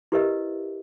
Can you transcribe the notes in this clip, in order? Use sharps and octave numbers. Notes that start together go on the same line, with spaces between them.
E4 G4 A#4 B4 D#5 E5